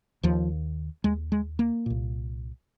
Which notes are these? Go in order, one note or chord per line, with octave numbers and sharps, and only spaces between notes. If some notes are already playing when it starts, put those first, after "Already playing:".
D#2 F3
D#2 G#3
G#3
A#3
C2 A#2